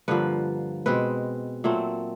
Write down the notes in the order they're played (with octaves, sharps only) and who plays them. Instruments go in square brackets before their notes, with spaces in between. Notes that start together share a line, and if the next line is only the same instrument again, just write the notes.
[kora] G2 D3 F3 A#3 B4
B2 G#3 C4 B4
A#2 F#3 A3 C4